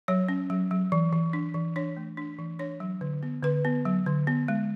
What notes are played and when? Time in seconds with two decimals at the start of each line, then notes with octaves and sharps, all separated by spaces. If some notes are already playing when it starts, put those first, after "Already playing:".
0.08 F#3 C#5
0.29 C#4
0.50 F#3
0.71 F#3
0.92 E3
1.13 E3
1.33 D4
1.54 E3
1.76 D4 C#5
1.97 A3
2.17 D4
2.39 E3
2.59 D4 C#5
2.80 F#3
3.01 D3
3.23 B3
3.43 D3 B4
3.65 B3
3.85 F#3
4.06 D3
4.27 B3
4.48 G#3